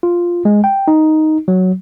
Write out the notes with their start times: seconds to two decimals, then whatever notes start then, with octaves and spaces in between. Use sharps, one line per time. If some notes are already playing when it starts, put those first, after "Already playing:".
0.03 F4
0.45 G#3
0.64 G5
0.88 D#4
1.48 F#3